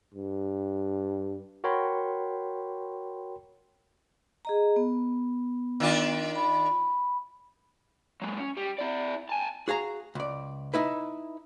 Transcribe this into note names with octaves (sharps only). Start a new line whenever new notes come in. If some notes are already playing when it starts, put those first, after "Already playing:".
G2
F#4 A#4 C#5 G5 B5 C6
G#4 D#5 A#5
B3
D#3 D4 F4
B5
F#3 G#3
C#4
G3
E4 D5
G#5 A5
F#4 G#4 F5 A#5
C#2 D5
D#4 E4 B4